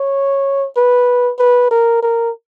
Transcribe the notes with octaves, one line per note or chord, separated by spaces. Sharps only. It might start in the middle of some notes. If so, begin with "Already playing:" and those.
Already playing: C#5
B4
B4
A#4
A#4